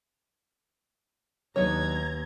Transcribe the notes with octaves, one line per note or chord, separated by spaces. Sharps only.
D#2 F#3 B3 D4 D#4 C#5 A#5 G#6